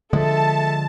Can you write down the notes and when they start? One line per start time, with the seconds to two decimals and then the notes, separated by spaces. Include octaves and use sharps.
0.13 D3 F3 G#3 A4 E5 A5